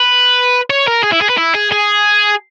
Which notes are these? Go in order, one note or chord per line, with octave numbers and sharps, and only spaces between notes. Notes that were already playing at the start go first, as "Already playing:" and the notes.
Already playing: B4
C#5
A#4
G#4
E4
G#4
B4
E4
G#4
G#4